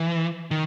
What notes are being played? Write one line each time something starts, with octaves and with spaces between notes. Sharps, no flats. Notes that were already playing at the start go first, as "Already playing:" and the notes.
Already playing: E3
D#3